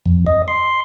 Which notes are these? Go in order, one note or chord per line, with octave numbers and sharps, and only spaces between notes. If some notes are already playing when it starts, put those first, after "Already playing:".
F2
D#5
C6